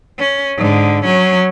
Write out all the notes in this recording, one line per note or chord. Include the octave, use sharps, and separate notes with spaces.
C#4
G#2 D3
F#3 C#4